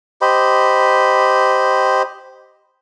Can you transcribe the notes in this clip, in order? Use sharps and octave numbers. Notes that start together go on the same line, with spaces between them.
G4 C5 D#5 B5